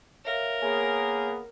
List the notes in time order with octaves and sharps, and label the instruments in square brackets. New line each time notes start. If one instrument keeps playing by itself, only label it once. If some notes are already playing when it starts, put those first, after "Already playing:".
[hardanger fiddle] A#4 [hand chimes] C#5 E5 F5
[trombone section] A#3 B3 G#4 [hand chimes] C#5 G#5